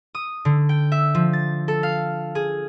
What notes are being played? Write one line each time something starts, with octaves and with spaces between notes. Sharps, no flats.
D#6
D3
G5
E5
F3
A6
A4
F5
G#4